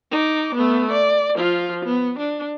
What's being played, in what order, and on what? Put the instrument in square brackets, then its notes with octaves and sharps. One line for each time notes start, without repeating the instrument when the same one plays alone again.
[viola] D#4 D6
A3 B3
D5
F3 F4
B3
D4